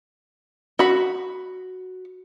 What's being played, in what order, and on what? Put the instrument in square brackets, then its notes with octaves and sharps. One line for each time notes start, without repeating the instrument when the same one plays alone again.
[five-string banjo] F#4 B5